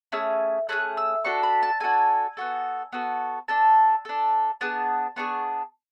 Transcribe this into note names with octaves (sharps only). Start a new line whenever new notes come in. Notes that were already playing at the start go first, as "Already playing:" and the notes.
A3 C#4 G#4 E6
A3 C#4 G#4 F#6
E6
D4 F#4 A4 C#6
B5
A5
D4 F#4 A4 G#5
B3 F#4 A4
B3 F#4 A4
D4 A4 A5
D4 A4
B3 D4 G#4 A5
B3 D4 G#4 C#6